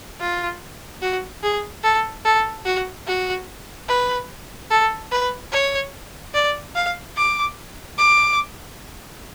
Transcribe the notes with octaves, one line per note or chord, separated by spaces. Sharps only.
F4
F#4
G#4
A4
A4
F#4
F#4
B4
A4
B4
C#5
D5
F5
D6
D6